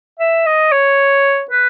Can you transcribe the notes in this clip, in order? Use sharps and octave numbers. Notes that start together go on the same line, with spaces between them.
E5
D#5
C#5
B4